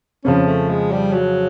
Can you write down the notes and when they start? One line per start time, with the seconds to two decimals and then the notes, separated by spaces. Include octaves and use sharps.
0.24 F2 C#3 F3 C#4
0.46 A3
0.69 G#3
0.92 G3
1.13 F#3